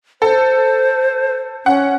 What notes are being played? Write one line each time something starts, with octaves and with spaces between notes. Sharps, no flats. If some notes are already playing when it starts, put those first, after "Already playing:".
A4 C5
C#4 F#5